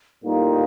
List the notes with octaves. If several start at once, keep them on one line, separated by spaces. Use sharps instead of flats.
A2 G3 A#3 D#4 F4 A#4